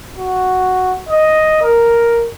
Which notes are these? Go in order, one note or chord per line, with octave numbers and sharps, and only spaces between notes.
F#4
D#5
A#4